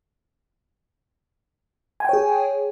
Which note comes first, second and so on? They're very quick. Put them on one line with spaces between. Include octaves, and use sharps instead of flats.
G#5 G5 C#5 G#4